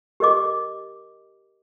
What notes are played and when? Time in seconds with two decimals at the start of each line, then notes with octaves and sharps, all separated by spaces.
0.20 G4 A#4 D#5 D6